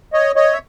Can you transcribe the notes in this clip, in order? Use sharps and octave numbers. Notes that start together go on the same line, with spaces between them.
C#5 D#5
C#5 D#5
E5